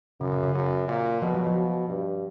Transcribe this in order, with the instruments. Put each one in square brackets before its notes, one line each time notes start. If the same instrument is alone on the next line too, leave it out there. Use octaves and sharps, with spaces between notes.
[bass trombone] F#2 [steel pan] C#3
[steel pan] C#3
C#3
[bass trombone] F#2
A#2
[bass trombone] B2 [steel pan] F3
[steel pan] F#3
F3
[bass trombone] G2